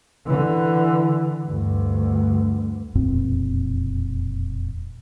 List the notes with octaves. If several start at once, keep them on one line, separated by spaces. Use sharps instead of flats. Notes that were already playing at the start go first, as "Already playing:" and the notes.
D3 E3
D2 G2
E1 F2 A#2 C4